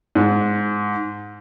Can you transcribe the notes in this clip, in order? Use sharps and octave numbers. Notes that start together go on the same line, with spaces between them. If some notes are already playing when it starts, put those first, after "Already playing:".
G#2